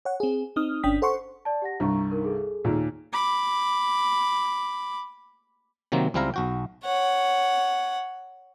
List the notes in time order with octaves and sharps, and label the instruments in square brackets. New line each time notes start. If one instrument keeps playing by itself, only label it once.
[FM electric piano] C#5 F#5
C4 G#4
C4 D#4 D#6 F6
G1 C#4 D4 G5 D#6 B6
A4 C5 F#5 C6 C#6
[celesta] D5 A5
G4 F#5 A#6
[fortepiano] C2 G2 [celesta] A#5 C#6
[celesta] D#4 A#4
G#4 A4
[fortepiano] D#2 A#2
[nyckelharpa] B5 D6
[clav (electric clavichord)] C3 D#3 F#3 A#3 C4
C#2 G3 C4 E4 F5 A#5
B1 F#4 G5
[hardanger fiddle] C#5 F#5